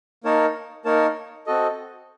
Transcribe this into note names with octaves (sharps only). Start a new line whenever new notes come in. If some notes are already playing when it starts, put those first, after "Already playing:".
A#3 D#4 A#4 C#5 A5
A#3 D#4 A#4 C#5 A5
C4 F#4 A4 D#5